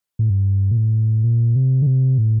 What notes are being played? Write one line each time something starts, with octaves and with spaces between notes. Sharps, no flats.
A2
G2
A#2
A2
A#2
C3
D3
C3
A2